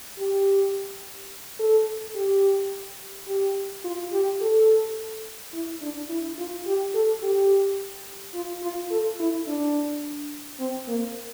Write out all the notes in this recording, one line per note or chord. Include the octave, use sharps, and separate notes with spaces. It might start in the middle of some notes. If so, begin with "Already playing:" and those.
G4
A4
G4
G4
F4
G4
A4
E4
D4
E4
F4
G4
A4
G4
F4
F4
A4
E4
D4
C4
A#3